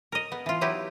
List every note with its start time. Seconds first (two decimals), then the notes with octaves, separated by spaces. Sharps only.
0.12 A#4 D#5
0.32 B3
0.46 E3 F4
0.61 F#3 D#4 E4 G4 B4